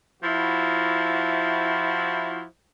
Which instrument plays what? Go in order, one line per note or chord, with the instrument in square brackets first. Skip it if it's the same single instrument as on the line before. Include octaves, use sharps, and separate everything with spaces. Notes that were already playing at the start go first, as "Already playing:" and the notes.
[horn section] F3 E4 F#4